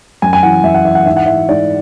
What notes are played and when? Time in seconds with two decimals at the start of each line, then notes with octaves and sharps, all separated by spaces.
0.22 F#2 G#5
0.33 G#5
0.43 E3 F#5
0.64 F#2 E5
0.75 F#5
0.85 E3 E5
0.95 F#5
1.06 G#2 E5
1.17 F#5
1.26 E3 E5
1.49 G#2 D5